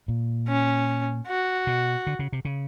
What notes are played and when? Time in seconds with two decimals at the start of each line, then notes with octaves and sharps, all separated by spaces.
0.08 A#2
0.48 C#4
1.27 F#4
1.67 B2
2.07 D3
2.19 C#3
2.33 C3
2.45 C#3